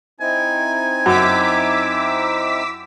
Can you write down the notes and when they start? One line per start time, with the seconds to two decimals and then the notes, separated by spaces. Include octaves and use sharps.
0.20 C4 D#4 E4 G#5
1.06 F#2 D6 E6 B6